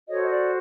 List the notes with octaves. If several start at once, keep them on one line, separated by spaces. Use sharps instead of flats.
F#4 A4 C5 C#5 D#5
D#5
D5